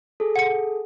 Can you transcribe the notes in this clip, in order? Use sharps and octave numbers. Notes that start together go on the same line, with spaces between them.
G#4 A4
F#5 C#7